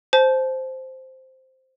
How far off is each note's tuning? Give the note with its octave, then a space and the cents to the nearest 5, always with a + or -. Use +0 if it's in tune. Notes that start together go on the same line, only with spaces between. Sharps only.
C5 +0 A5 -30